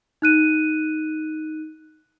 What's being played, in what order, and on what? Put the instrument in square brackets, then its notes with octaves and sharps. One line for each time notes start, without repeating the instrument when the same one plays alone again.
[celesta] D#4 F#6 D#7